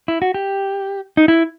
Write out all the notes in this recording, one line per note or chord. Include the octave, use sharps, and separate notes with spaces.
E4
F#4
G4
D#4
E4